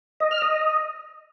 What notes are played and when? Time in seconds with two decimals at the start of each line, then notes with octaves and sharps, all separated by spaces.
0.20 D#5
0.31 F6
0.42 D#5